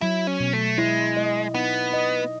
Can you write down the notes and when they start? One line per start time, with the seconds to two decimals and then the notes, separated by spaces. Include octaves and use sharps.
0.01 F#3 E4
0.27 C#4
0.40 B2
0.53 A3
0.78 G#3 E4
1.17 D#5
1.54 B3 D#4
1.93 D#5